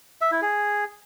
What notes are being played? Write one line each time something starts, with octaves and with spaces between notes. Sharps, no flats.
E5
E4
G#4